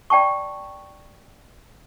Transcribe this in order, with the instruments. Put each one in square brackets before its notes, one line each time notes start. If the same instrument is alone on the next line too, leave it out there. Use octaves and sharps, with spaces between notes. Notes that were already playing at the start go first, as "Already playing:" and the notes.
[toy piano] D5 G5 A5 C#6